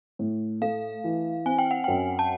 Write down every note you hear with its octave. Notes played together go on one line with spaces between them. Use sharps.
A2
A3 F5
E3
C4 G#5
G5
F#5
F#2 G5
A5